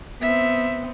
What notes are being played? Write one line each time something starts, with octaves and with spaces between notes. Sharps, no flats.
B3 C4 E5